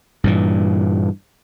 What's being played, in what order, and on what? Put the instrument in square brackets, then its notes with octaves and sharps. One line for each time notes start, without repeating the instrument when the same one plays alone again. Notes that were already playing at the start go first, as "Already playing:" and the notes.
[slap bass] G2 A#2 E3